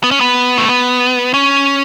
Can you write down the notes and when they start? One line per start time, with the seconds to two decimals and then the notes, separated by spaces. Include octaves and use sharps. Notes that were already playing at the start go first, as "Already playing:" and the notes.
0.04 B3
0.11 C#4
0.21 B3
0.58 A3
0.68 B3
1.34 C#4